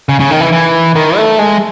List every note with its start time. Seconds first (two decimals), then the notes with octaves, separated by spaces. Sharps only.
0.09 C#3
0.20 C#3
0.31 D#3
0.40 E3
0.52 E3
0.96 D#3
1.17 A3
1.39 G#3